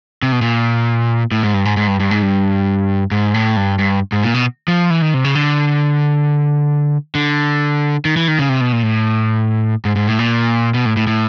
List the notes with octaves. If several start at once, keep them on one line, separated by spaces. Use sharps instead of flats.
C3
B2
A#2
A2
G#2
G2
G#2
G#2
G2
G2
G#2
G2
G#2
A2
G2
G2
G#2
A#2
B2
F3
E3
D#3
C3
C#3
D3
D3
D#3
E3
D#3
C#3
C3
B2
A#2
A2
G#2
G#2
A2
A#2
B2
A2
A2
A2